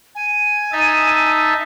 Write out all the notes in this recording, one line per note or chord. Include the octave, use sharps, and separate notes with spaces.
G#5
D#4 E5 A5